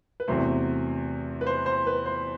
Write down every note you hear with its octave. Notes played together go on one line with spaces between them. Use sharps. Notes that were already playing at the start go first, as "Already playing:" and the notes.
B4
E2 C3 F#3 A3 C5
B4
C5
C5
B4
C5